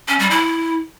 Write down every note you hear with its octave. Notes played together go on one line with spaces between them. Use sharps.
C#4
G3
E4